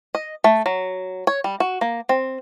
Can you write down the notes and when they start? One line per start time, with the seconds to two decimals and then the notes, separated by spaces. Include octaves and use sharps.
0.15 D#5
0.44 A3
0.66 F#3
1.27 C#5
1.44 G3
1.60 F#4
1.81 A#3
2.09 C4